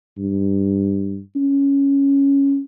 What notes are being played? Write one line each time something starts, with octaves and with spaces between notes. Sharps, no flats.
G2
C#4